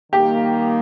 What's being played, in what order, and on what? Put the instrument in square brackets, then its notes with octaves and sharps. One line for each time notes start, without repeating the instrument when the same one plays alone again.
[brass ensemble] D#3 G3 A#3 D#4 [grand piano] G4